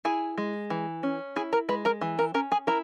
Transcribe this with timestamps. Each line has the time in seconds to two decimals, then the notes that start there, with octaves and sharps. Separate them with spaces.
0.05 E4 G#4 G#5
0.38 G#3
0.70 E3
1.03 C#4
1.36 E4 G#4 G#5
1.53 A#4 A#5
1.69 G#3 B4 B5
1.85 A#4 A#5
2.01 E3
2.19 A#4 A#5
2.34 C#4 A#4 A#5
2.52 G#4 G#5
2.67 E4 A#4 A#5